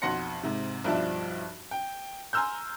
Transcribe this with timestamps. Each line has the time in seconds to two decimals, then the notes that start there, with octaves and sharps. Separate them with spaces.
0.02 B1 F2 F#5 C6 A#6 C#7
0.43 G#2 C3
0.84 B1 G2 F3 D4 E5 A5
1.71 G5
2.33 G#5 A#5 C6 E6 F6 G6